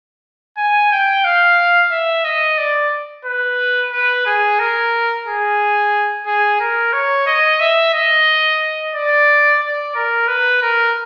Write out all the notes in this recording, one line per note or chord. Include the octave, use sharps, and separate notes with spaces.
G#5
G5
F5
E5
D#5
D5
B4
B4
G#4
A#4
G#4
G#4
A#4
C#5
D#5
E5
D#5
D5
D5
A#4
B4
A#4